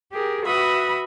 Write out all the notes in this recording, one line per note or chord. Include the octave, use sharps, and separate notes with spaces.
G4 G#4 A#4
F#4 B4 E5 B5 D#6